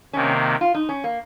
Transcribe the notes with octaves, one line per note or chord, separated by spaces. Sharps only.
C3 D#3 A#3 C#4
F4
D#4
C#4
A#3